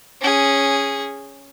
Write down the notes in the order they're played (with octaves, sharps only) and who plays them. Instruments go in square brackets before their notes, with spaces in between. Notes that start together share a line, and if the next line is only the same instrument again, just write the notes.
[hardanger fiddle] C#4 G#4